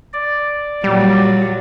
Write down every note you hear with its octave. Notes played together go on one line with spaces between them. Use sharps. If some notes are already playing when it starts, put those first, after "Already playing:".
D5
A#2 F#3 G3